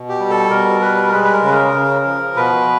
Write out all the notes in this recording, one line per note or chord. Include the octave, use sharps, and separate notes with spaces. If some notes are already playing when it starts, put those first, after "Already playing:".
Already playing: B2
G4
G3
A4
B2 A#4
G3 B4
A#4
G#3 B4
B4
A#4
C#3 B4
A#4
C#3
F3
B2 B4